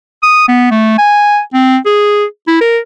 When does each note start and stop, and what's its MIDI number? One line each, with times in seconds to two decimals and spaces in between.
0.23 0.48 87
0.48 0.69 59
0.71 0.98 57
0.98 1.40 80
1.54 1.77 60
1.85 2.25 68
2.47 2.57 64
2.61 2.79 70